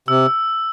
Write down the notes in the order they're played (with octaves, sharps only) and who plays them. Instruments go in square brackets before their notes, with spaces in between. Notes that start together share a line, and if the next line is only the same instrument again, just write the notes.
[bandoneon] C3 [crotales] E6